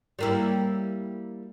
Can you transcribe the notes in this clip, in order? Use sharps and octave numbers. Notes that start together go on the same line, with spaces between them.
G3 A#3 E4